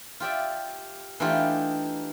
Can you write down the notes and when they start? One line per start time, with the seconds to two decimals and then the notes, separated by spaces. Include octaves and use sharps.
0.20 F4 G4 D5 E5
1.20 E3 A3 D4 D#4 F4 G4